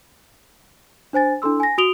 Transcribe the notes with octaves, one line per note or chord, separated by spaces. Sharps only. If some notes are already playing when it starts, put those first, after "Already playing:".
D4 C5 G#5 A6
D4 E4 A4 C6 E6
G#5 A#6
F#4 D#6 D7 F7 G7